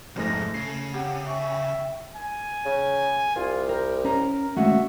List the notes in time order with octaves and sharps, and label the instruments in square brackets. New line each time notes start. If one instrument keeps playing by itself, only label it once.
[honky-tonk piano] C2 G#3 A#6 [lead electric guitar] F2 G#2 [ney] A3
[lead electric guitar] C#3 [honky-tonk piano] C7
[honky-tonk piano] C3 [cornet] F#5 [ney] G5
[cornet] E5 [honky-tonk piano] C#6
[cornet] G#5
[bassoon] C#3
[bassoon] C2 [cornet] F4
[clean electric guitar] A#4 [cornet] G5
[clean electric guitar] C#4 A#5 [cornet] A#4
[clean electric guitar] G#3 A3 C#4 [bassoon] F#4 [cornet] E5